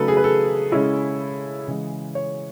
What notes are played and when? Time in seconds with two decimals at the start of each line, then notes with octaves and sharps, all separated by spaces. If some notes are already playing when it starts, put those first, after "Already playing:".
Already playing: C#3 F#3 A3 D#4 A4 B4
0.08 G#4
0.17 B4
0.24 A4
0.72 C#3 G#3 C#4 E4
1.68 C#3 E3 G#3
2.15 C#5